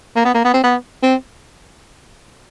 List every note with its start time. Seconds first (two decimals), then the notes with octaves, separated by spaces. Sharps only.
0.16 A#3
0.25 B3
0.35 A#3
0.45 B3
0.54 C4
0.64 B3
1.03 C4